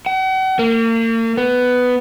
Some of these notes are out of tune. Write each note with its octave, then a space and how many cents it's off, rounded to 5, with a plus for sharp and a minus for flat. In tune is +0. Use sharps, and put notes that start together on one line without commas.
F#5 +40
A#3 -40
B3 +10